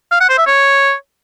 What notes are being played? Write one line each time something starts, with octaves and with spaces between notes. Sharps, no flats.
F5
F#5
C5
E5
C#5